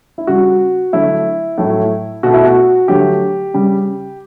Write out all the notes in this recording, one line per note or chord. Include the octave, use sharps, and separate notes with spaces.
E4
C#3 G3 F#4
D3 F#3 A3 E4
A2 F#3 A3
B2 A3 F#4
E4
F#4
D3 F#3 A3 G4
C#3 G3